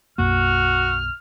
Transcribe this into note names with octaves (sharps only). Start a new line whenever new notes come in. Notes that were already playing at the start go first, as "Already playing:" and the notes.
B1 F#2 A#3 F#4 F6